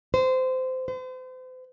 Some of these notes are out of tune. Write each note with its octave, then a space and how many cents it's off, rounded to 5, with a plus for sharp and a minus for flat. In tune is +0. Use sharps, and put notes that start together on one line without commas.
C5 -20
C5 -40